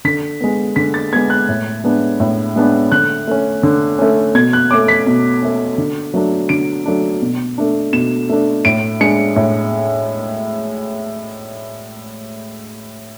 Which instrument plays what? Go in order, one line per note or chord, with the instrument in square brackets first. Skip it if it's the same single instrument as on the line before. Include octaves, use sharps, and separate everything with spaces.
[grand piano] D3 B6
G#3 B3
D3 B6
A6
G#3 B3 G#6
F#6
A2
G#3 B3 D4
A2
G#3 B3 D4
D3 F#6
A3 C#4
D3
A3 C#4
B2 G#6
F#6
A3 C#4 D6
B6
B2
A3 C#4
D3
F#3 A3 D4
D3 D7
F#3 A3 D4
B2
A3 D4
B2 E7
A3 D4
A2 D7
G#3 D4 C#7
A2